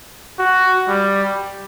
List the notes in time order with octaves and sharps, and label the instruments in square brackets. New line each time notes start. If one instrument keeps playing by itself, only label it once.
[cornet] F#4
G3